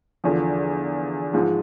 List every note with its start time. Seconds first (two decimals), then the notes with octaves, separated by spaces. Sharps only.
0.24 E2 D3 F3
1.33 G#2 F3 G#3